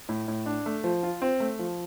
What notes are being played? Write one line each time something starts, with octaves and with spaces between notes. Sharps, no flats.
A2
A2
D4
A3
F3
F4
C4
A3
F3